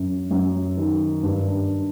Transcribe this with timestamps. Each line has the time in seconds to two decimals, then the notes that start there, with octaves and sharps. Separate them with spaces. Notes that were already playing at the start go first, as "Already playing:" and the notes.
Already playing: F#2
0.31 F#2
0.77 D#3
1.23 G2